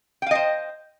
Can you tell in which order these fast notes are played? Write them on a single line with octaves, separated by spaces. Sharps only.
G5 F5 D#5 C5